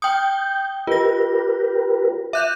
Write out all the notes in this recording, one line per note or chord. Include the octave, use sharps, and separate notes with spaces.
G5 D#6 G6
F4 G4 A#4 B4 A#6
E5 F#6 G6